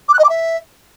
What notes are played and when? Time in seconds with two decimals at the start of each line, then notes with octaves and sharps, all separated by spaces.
0.08 D6
0.13 F#6
0.19 D#5
0.24 D6
0.29 E5